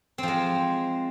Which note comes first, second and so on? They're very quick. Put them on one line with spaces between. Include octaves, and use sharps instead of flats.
C4 F3 G#3